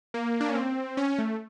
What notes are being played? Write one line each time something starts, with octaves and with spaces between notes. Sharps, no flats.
A#3
D4
C#4
C4
C#4
A3